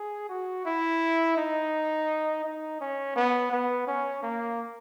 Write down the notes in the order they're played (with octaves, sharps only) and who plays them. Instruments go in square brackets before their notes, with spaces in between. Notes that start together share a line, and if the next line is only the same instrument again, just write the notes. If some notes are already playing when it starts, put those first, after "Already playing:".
Already playing: [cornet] G#4
F#4
E4
D#4
D#4
C#4
B3
B3
C#4
A#3